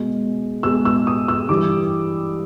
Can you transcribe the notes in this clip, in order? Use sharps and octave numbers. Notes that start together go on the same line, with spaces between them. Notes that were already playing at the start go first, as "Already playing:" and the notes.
Already playing: B2 G#3
B2 G#3 E6
E6
D#6
E6
G2 E3 G3 D6